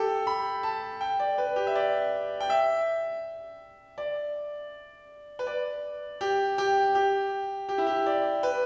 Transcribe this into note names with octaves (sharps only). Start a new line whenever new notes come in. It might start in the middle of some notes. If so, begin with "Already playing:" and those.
Already playing: G4 A4
B5
A5
G5
D5
B4
G4
E5
D5
G5
E5
D5
B4
D5
G4
G4
G4
G4
E4
G4
D5
B4